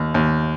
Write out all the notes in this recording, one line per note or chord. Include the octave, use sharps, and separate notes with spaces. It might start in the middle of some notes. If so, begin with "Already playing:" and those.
Already playing: D#2
D#2